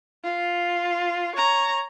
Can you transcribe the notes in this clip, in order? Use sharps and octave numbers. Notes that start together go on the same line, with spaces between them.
F4
C#5 A#5